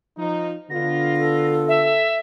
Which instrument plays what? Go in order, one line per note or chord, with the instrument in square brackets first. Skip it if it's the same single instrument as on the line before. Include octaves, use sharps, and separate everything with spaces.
[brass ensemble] F3 D#4
[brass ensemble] D3 B3 F4 [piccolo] A#6
[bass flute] A4
[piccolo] E5